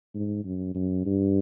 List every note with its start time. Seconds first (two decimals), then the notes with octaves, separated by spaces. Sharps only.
0.14 G#2
0.44 F#2
0.75 F#2
1.05 G2